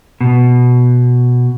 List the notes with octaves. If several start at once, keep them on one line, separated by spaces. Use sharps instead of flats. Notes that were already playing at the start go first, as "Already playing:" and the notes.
B2